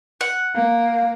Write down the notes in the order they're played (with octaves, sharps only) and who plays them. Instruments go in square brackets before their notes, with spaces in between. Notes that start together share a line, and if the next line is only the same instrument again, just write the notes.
[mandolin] F#5
[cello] A#3 [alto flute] F5